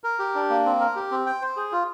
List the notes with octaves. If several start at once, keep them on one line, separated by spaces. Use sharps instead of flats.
A#4
G4
D4
A#3
C4
A#4
G4
C4
G5
C5
G#4
F4